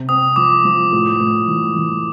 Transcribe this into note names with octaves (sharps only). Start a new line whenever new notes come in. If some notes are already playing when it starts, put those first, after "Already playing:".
Already playing: C3
C4 D#6
F3 D6
F3
A2
A2
E3
E3